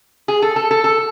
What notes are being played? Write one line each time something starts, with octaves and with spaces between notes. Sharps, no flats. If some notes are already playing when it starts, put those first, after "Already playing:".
G#4
A4
A4
A4
A4